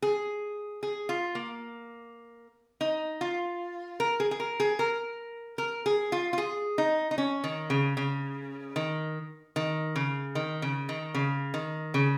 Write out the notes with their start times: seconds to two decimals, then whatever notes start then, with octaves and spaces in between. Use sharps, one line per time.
0.02 G#4
0.83 G#4
1.09 F4
1.35 A#3
2.81 D#4
3.21 F4
4.00 A#4
4.20 G#4
4.31 G#4
4.40 A#4
4.60 G#4
4.79 A#4
5.58 A#4
5.86 G#4
6.12 F4
6.33 F4
6.38 G#4
6.78 D#4
7.11 D#4
7.18 C#4
7.44 D#3
7.70 C#3
7.97 C#3
8.76 D#3
9.56 D#3
9.96 C#3
10.35 D#3
10.62 C#3
10.89 D#3
11.15 C#3
11.54 D#3
11.94 C#3